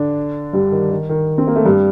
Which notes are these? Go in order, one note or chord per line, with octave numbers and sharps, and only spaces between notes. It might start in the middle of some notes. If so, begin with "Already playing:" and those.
Already playing: D3 D4
G2 G3
D#3
D#3
D#3
C4
A#3
A3
G2 G3